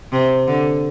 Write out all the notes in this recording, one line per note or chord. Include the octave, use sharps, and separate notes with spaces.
C3
D3